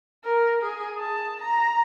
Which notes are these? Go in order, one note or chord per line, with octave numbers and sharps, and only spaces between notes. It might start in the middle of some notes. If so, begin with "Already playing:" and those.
A#4
G#4
A5
A#5